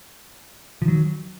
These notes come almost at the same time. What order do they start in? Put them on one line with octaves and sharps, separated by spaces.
F3 D#3 F#3